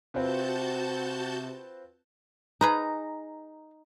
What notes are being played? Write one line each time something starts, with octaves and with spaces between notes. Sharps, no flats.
C3 C4 F4 F#4 B4 A5 G6
D#4 G#4 B4 A#5